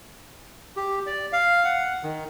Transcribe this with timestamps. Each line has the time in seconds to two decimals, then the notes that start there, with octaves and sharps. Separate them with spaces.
0.76 G4
1.07 D5
1.33 F5
1.64 F#5
2.03 D#3